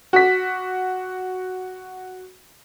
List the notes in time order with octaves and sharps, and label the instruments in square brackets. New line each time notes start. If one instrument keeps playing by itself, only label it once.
[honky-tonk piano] F#4 B6